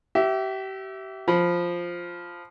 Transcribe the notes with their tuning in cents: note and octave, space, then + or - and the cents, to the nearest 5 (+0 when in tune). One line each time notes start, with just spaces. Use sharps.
G4 -35 E5 +0
F3 +0 B5 +0